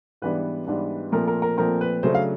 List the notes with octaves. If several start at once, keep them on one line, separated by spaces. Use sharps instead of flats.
G#2 E3 G3 B3 D4 B4
G#2 E3 G3 B3 D4
A#2 F3 A3 C4 A#4
A#4
A#4
A#2 F3 A3 C4 A#4
B4
C#3 F#3 A3 D4 C5
F5